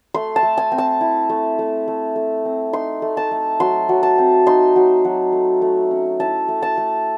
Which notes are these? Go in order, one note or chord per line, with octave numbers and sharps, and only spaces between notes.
A3 C6
A5
A3
G#5
C4
A5
E4
A3
A3
A3
A3
C4
D#4 C6
A3
A5
A3
F#3 C6
F#3
A5
C4
D#4 C6
F#3
F#3
A3
A3
C#4
E4 A5
A3
A5
A3